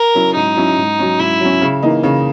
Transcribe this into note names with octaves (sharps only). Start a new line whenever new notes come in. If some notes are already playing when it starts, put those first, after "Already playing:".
Already playing: A#4
F#3 C#4 E4
G#2 D#4
F#3 C#4 E4
G#2
F#3 C#4
G#2 E4
F#3 C#4
C#3
E3 A#3 D#4
C#3